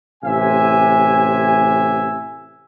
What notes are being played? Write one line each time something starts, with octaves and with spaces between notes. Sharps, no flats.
A1 C3 E5 G#5